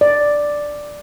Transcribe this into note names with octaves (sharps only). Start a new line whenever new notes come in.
D5